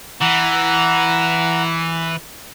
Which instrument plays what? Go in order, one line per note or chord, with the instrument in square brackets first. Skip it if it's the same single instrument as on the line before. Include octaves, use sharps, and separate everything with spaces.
[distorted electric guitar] E3 [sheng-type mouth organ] F#5 A#5